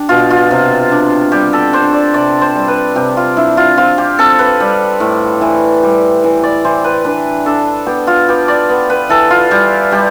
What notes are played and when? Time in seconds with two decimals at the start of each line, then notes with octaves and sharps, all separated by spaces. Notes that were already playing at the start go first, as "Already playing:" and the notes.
Already playing: D4 G4
0.09 B2 F4
0.30 F4
0.51 C3
0.91 D4
1.32 G3 G4
1.53 A4
1.73 D4 C5
1.93 D5
2.14 C3 D5
2.41 C5
2.56 G3
2.68 B4
2.95 C3 G4
3.17 F4
3.36 D4 E4
3.57 F4
3.77 C4 F4
3.98 G4
4.18 C4 A4
4.39 B4
4.60 G3
5.00 A2
5.41 E3
5.83 G3
6.24 E3
6.43 D5
6.65 E3 C5
6.84 B4
7.05 D4 B4
7.46 D4 A4
7.86 B3 G4
8.07 F4
8.28 B3 G4
8.48 D5
8.69 B3
8.90 B4
9.09 E3 A4
9.30 F4
9.51 G3 G4
9.91 G3 G4